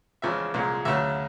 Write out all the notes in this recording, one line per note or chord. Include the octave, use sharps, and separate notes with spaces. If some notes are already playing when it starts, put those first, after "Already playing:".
E2 C#3 F3 G#3 E5
C2 A#2 F3 G#3
D2 C#3 F#3 E5